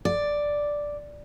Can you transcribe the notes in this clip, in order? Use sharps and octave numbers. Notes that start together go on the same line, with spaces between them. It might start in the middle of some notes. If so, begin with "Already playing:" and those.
D5